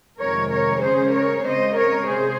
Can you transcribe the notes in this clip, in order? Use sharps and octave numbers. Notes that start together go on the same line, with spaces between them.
F2 C3 D#3 G#3 A#4 C#5
A#4 C#5
C#3 G#3 C#4 G#4 C5
A#4 C#5
C#3 G#3 C4 C5 D#5
A#4 C#5
C3 G#4 C5